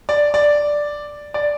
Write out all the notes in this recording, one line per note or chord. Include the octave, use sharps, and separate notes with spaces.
D5
D5
D5